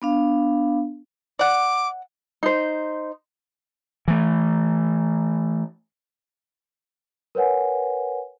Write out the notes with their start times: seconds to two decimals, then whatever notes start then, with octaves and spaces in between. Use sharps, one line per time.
0.02 B3 D4 F5
1.39 D5 F#5 D6
2.43 D#4 C5
4.08 E3 A3
7.35 A#4 B4 C#5 F#5 G#5